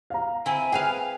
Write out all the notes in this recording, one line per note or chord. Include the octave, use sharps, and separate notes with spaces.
F5 A#5
C4 E4 G#5
G#4 B4 F5 G5